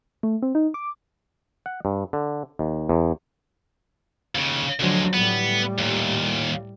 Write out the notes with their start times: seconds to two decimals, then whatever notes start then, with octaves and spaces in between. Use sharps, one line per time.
0.23 A3
0.42 C4
0.55 D#4
0.74 D6
1.66 F#5
1.85 G2
2.13 D3
2.59 D#2
2.89 E2
4.35 D#2 C#3
4.80 D2 D3 F3 F#3 G#3
5.14 A2 G3 B3
5.78 D#2 A#2